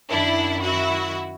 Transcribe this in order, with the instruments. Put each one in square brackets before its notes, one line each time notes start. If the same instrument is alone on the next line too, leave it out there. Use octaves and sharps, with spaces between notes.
[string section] F#2 D#3 D4 E4
E4 F#4